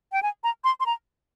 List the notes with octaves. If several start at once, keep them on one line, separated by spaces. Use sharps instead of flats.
G5
G#5
A#5
C6
C6
A#5